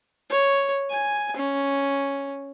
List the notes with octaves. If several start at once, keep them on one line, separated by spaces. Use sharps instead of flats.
C#5
G#5
C#4